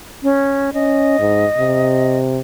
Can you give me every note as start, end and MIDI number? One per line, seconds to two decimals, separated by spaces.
0.23 0.70 61
0.73 1.16 61
0.73 2.18 75
1.19 1.45 44
1.58 2.40 48